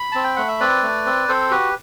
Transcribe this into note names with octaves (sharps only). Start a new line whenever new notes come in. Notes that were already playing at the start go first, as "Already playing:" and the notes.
Already playing: B5
C4 A5
G5
A3 F#5
E5
C4 B4 D5
A3
C4
C4 A4 C5
F#4 G4 B4